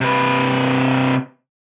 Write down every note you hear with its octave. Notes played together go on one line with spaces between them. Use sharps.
C3 B4